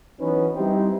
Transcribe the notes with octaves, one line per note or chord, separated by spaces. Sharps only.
E3 F#3 B3 C#4 D#4 B4
G3 C4 D#4 E4 G4